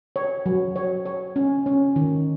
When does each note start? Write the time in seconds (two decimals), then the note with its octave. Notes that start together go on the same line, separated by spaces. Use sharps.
0.16 C#5
0.46 F#3
0.76 C#5
1.06 C#5
1.36 C#4
1.66 C#4
1.96 D#3